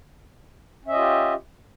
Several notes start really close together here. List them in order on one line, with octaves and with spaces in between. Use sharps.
C#4 E5 D#5 F4 G4